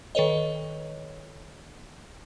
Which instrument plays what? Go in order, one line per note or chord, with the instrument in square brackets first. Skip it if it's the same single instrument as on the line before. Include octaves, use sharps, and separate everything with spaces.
[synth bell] D#3 A4 B4 C#5 D#5